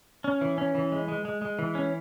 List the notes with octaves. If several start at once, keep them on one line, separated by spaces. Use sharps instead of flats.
C#4
E3
C#4
E3
G#3
G#3
G#3
G#3
E3
C#4